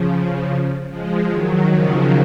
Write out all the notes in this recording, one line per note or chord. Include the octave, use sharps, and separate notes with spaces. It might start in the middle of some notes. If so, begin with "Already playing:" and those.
Already playing: C#3 F3
F3 G#3
D#3 F#3
C#3 F3